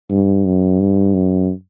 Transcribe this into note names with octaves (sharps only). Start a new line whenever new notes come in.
G2
F#2
G2
F#2